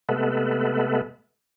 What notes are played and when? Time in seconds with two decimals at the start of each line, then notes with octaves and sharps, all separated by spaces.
0.09 C3 G#3 A3 B3 A4 B4